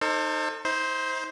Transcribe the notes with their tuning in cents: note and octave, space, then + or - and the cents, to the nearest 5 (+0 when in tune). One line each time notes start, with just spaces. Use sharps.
D#4 -10 A4 +35 C5 +25
D#4 +45 C5 +0